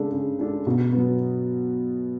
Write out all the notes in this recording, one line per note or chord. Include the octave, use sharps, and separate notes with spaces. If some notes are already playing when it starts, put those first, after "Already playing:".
Already playing: C#3 G#3 D4 A4
C#3
G#3 D4 A4
B2
F#3 B3